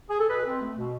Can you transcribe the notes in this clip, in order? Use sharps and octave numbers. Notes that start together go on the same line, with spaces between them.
G#4
A4
B2 B4
C4
A3
B2